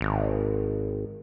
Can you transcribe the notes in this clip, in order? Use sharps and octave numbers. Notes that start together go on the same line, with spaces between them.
G#1